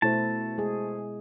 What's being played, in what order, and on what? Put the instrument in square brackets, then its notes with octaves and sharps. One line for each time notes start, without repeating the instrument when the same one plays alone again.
[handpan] B2 E4 [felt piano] A3 C5 [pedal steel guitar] A5
[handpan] G#3 G#4